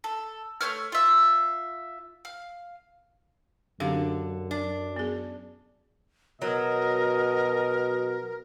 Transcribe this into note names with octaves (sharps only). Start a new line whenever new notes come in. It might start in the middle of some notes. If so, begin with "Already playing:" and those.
A4
A3 C5 C#5 F6
F4 E5
F5
F#2 D3 C4 G4 F5
D4
B3 G#4
B2 F#3 A#4 D#5